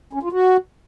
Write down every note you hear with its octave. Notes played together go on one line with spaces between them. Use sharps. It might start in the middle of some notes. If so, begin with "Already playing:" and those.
C#4
F4
F#4